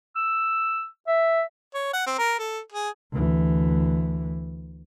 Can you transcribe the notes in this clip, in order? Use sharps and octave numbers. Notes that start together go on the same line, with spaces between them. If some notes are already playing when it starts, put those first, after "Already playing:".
E6
E5
C#5
F#5
C4
A#4
A4
G#4
D2 E3